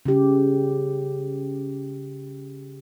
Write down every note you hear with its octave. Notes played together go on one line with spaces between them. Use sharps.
C#3 G4